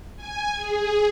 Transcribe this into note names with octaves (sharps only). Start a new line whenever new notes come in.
G#5
G#4